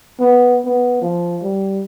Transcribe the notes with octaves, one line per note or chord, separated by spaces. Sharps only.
B3
B3
F3
G3